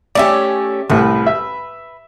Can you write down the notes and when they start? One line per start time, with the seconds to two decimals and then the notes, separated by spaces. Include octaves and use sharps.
0.15 A3 C#4 G4 D5 E5
0.90 C2 A2 B4
1.27 E5